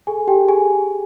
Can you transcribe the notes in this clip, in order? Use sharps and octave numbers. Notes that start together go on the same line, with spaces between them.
G#4 A4 G#5
G4 G5
A4
G#4 G#5